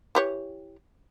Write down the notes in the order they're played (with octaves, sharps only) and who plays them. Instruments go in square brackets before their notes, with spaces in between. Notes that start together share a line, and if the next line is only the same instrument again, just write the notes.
[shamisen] E3 G4 C#5